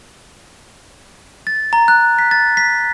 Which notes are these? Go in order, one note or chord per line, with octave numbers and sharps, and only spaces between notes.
A6
A#5
F#6
B6
A6
B6